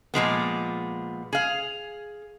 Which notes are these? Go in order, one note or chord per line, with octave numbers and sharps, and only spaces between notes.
A#2 F3 G#3 B3
G#4 F5